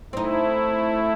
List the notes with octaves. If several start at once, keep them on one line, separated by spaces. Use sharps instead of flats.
A3 C4 D#4 E4